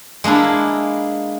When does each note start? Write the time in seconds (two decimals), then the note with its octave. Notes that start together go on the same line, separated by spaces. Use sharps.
0.24 G#3 A#3 D4 E4